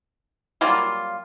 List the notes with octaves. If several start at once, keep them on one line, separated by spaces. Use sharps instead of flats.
F#3 G3 A#3 F4